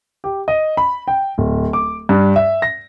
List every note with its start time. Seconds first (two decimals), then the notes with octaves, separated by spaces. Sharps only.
0.24 G4
0.48 D#5
0.77 B5
1.08 G5
1.38 D1
1.73 D6
2.09 G2
2.36 E5
2.62 A#6